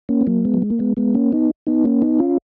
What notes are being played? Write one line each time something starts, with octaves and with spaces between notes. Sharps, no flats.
A#3 C#4
B3
F#3 A#3
G#3 B3
F#3
G#3
A#3
G#3 B3
G#3 B3
A#3 C#4
B3 D#4
B3 D#4
A#3 C#4
B3 D#4
C#4 F4